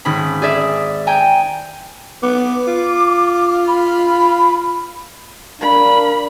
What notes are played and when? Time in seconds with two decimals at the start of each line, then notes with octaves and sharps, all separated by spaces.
0.05 G#1 C#4 B5
0.42 G#4 D5 E5
1.07 G5 G#5 A#5
2.22 B3 D6
2.67 F4
3.67 B5
5.62 D4 A#4 F5 B5